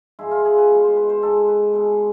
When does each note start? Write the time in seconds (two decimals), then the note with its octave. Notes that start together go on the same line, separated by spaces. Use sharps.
0.19 G#2 F3 G#3 E4
0.31 F4
0.45 G#4
0.58 B4
0.71 B2 G#3
0.84 C5
0.97 B4
1.09 C5
1.23 G#2 G#3 A4
1.48 B4
1.73 B2 G#3